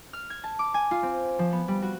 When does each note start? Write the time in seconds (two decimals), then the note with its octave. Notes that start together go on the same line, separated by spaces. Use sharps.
0.13 F6
0.30 G#6
0.44 A5
0.59 D6
0.74 G#5
0.91 F4
1.03 C4
1.39 F3
1.53 B3
1.68 G3
1.82 F#4